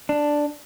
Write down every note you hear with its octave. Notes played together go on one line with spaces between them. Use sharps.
D4